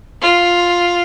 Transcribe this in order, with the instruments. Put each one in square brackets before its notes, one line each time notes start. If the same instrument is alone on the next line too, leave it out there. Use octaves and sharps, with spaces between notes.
[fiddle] F4